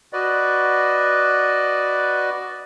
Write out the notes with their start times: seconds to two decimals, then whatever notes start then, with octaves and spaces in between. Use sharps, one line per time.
0.13 F#4 B4 D5 D#5